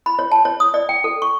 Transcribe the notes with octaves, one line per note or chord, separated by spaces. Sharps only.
B5
C#5
A5
C#5
D#6
D5
G5
A4
C#6